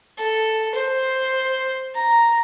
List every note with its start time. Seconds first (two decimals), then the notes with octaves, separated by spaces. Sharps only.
0.18 A4
0.75 C5
1.95 A#5